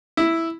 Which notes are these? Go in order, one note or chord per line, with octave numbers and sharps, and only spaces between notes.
E4